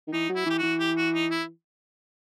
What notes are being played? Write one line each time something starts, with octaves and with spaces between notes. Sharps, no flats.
D#3
E3 D#4
F#3
E4
E3 G4
E3 F#4
G4
F#4
D#4
E4